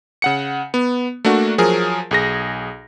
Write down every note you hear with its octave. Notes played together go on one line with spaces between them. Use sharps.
C#3 F#5 C#7
B3
A3 A#3 D4 F#4
F3 F#3 G#4 A#4
B1 G#4 A#6